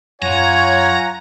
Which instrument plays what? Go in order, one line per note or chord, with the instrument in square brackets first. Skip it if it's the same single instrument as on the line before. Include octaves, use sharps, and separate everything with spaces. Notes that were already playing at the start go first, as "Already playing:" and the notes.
[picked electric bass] F#2 [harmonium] F4 F#5 G#5 [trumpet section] C#5 [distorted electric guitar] A#5